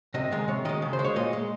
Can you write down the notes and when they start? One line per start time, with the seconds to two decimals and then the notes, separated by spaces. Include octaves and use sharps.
0.14 C3 D#5
0.32 D#3 G#3
0.48 C3 C#5
0.65 D#3 G#3 D#5
0.82 C#3
0.93 C5
0.99 G#3
1.04 C#5
1.16 A#2 D#5
1.33 G#3